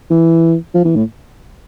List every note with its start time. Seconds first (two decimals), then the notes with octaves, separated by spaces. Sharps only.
0.10 E3
0.74 F3
0.85 E3
0.96 A2